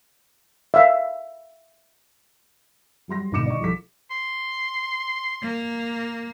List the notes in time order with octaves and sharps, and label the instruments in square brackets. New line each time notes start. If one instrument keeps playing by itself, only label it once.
[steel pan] E5 F5
[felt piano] F#3 G3 C6 A#6
G#1 B2 D3 D6 C#7 E7
D5 D#5 C#6
C2 F3 G3 A4 B6
[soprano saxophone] C6
[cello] A#3